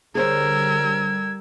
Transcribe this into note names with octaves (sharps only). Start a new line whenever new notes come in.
D3 G3 G#4 A#4 C5 C#5 E6 G#6